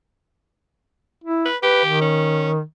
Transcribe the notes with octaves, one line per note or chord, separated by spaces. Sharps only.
E4
B4
G4 B4
D#3
C#4